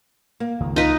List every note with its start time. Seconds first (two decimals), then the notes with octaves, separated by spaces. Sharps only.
0.40 A#3
0.60 C#2 D#3 F3
0.76 D#4 F4 B4